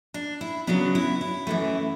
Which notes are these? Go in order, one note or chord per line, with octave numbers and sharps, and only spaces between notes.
D4
E4
C#3 F#3 B3 D4
E4
E4
F#2 E3 A3